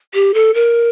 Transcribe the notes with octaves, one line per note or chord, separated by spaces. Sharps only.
G4
A4
A#4